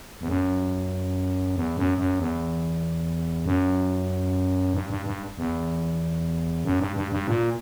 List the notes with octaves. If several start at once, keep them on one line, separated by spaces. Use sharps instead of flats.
E2
F#2
E2
F#2
F#2
E2
F#2
G2
G2
G2
E2
F#2
G2
G2
G2
A#2